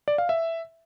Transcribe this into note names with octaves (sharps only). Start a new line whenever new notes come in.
D5
F5
E5